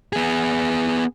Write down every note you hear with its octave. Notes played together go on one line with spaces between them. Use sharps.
B3 G#4